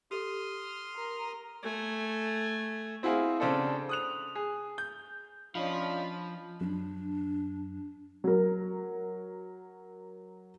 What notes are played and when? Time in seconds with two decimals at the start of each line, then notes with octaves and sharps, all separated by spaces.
0.11 G4 A4 C6 D#6 F6
0.95 A#4
1.63 A3 G#5
3.03 C4 E4 F#4 G#4 F5
3.40 C#3 C4 D4 A4
3.89 D#6 F#6 F7
4.36 G#4
4.78 G6
5.55 F3 C#4 D4 F4 C#5 D#5 F5 B5
6.61 F#2 D4
8.24 F#3 A#4